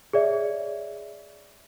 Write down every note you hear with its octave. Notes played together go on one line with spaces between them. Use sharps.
G#4 C#5 D5 E5